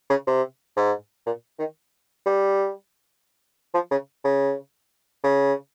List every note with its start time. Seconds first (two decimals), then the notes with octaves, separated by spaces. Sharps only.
0.10 C#3
0.27 C3
0.77 G#2
1.26 A#2
1.59 D#3
2.26 G3
3.74 F3
3.91 C#3
4.24 C#3
5.23 C#3